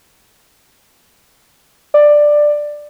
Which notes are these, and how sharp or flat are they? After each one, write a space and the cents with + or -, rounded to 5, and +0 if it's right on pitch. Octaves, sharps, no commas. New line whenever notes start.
D5 +10